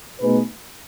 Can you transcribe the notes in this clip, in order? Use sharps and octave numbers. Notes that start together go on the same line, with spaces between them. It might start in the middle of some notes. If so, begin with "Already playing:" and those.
B2 A3 D#4 G#4 B4